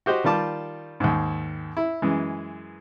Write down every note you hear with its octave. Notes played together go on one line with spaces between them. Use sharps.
F#4 G4 C5 D#5
D#3 G3 F4 A5 D6
D#2 G#2
E4
F#2 E3 G#3